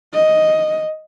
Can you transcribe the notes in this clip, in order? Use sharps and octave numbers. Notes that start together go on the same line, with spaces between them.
D#5